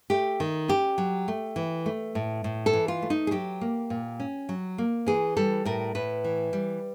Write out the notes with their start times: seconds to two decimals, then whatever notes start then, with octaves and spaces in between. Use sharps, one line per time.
0.10 A3 G4
0.40 D#3
0.68 C#4 G4
0.98 F#3
1.28 A3
1.56 E3
1.86 A3
2.15 A2
2.44 A2
2.66 A4
2.73 E3
2.88 F4
3.02 A3
3.10 D#4
3.27 G#4
3.31 F#3 G4
3.61 A#3
3.90 A#2
4.20 C#4
4.49 F#3
4.78 A#3
5.06 E3 G#4
5.37 G3 A4
5.65 A2 A#4
5.95 A2 B4
6.24 E3
6.53 G3